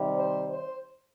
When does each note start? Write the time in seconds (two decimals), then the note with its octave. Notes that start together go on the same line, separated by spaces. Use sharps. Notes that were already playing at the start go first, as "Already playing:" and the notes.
Already playing: C3 D#3 G3
0.14 C5
0.50 C5